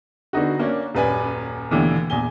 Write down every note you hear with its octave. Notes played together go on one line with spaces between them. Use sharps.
D3 B3 D#4 F#4
A#3 C#4 D4
D#1 F#2 B4 D5 G#5 B5
D#2 B2 D3 E3 A3
A#1 E2 G#5 G7